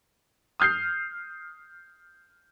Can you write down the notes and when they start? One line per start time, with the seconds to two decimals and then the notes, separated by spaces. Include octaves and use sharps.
0.60 D#6 F6 G6 C7